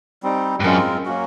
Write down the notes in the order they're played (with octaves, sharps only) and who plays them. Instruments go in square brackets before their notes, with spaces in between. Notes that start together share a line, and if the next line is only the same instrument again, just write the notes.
[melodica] G3 C4 D#4
[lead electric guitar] G2
[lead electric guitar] F#2 [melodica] G#3 C4 F4 A#4
[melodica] F#3 A#3 C#4 F#4